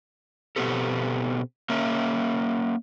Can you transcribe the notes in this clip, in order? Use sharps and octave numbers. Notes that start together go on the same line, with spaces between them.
B2 D#3 B3 C4 G4 A4
A#3 C#4 A#4 E5